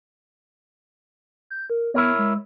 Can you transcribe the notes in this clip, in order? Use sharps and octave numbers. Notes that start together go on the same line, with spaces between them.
G6
A#4
B3 E4 A#4 C#5
G#3